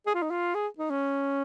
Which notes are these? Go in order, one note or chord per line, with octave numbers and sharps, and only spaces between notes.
G#4
F4
D#4
F4
G#4
D#4
C#4